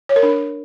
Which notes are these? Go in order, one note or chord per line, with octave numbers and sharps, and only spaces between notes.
C#5
A#4
D4